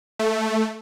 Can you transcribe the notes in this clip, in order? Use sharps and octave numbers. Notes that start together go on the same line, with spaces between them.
A3